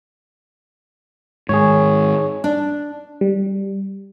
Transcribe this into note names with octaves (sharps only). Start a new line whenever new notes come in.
G#2 D#3 G#4 C#5
D4
G3